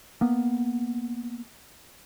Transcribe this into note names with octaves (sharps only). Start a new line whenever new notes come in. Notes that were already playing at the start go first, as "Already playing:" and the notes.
A#3 B3